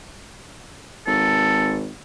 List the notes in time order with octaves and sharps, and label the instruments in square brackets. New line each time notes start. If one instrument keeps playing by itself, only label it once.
[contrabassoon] G#1 [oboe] A4